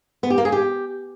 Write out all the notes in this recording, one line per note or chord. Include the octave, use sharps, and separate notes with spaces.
B3
G4
A#3
G#4
G4